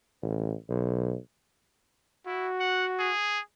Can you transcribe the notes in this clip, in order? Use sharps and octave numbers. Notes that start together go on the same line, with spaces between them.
A1
B1
E4 F#4
F#5
G#4